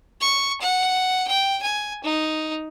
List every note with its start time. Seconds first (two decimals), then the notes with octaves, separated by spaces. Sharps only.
0.21 C#6
0.61 F#5
1.28 G5
1.63 G#5
2.04 D#4